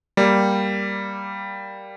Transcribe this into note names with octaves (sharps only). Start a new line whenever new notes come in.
G3 A#3